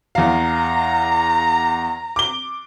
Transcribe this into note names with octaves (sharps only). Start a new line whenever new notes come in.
E2 F5 A#5
D6 G7